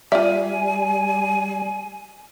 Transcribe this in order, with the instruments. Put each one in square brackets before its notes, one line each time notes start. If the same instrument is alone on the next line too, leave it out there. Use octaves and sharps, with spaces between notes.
[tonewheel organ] G3 [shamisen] F4 G4 D5 [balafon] E5 [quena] G#5